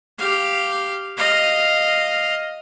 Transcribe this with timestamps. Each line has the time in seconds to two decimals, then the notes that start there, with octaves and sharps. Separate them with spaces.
0.19 G4 F5
1.17 D#5 F5